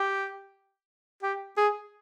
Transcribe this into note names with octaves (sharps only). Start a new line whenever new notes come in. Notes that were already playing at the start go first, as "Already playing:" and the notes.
Already playing: G4
G4
G#4